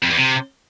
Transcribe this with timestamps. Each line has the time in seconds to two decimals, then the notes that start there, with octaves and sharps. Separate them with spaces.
0.02 F2
0.10 E2
0.17 C3